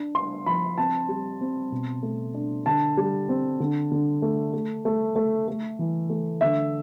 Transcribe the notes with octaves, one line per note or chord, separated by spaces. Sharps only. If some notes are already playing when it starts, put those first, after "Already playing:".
Already playing: D4
D4 C6
F3 B5
C4 A5
G3
C4
B2
A3
D4
D3 A5
G3
C4
D3
D3
A3
A3
A3
A3
A3
E3
A3
D3 E5